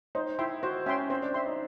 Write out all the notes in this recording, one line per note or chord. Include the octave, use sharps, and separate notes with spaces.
D#4 C5
E4 E5 G5 C6
F#4 C5
C#4 E5 G5 C6
C4 C5
D4
E5 G5 C6
D#4